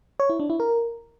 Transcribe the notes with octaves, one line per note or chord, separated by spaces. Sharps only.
C#5
E4
D4
E4
A#4